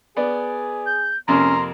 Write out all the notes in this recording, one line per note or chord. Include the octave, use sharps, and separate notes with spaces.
B3 G#4 D5
G6
F2 C3 A#3 C#4 A#5 C6